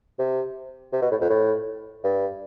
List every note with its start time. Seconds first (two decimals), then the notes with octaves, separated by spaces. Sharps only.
0.19 C3
0.93 C3
1.02 B2
1.11 A2
1.21 F2
1.30 A2
2.04 G2